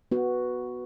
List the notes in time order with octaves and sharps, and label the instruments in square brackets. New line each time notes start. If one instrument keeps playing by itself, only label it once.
[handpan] B3 F#4